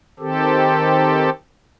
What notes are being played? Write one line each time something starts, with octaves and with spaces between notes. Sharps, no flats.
D#3 C4 G4 A4